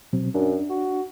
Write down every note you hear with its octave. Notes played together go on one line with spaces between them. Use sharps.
B2 F#3 C4
F#2 D4
F#4